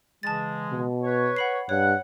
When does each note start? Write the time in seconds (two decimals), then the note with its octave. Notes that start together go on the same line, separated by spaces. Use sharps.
0.23 C#3 E3 G#3 A5 A6
0.70 B2
1.03 B4 C#5
1.36 F#5 B5 C7
1.69 G2 C#5 F#5